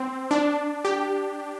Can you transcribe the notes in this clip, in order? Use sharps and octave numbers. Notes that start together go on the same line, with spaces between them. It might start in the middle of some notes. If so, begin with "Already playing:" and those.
Already playing: C4
D4
G4